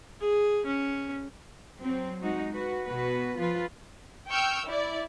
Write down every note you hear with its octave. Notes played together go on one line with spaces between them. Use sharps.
G#4
C#4
F#3 C4
G#3 D#4 F#4
F#4 B4
B2 F#4 B4
F3 F4 B4
G5 C#6 E6 F6 G6
E4 D5